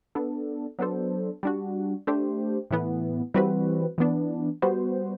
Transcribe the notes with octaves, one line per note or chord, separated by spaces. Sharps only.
B3 D4 A4
F#3 B3 D4 A4 C5
G3 D4 F#4
A3 D4 G4 C5
A2 E3 B3
E3 G3 C4 F#4 B4
E3 B3 D4
G3 B3 F#4 C5